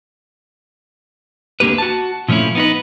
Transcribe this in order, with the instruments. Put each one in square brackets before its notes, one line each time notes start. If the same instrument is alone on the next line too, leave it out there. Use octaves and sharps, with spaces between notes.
[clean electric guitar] D2 D3 A#3 G4 B4
F#4 A5
A#2 F3 A3 C#4 E4
B3 D#4 B4